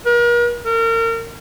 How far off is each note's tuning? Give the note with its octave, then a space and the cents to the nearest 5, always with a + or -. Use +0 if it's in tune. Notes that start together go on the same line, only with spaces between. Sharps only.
A#4 +40
A#4 -35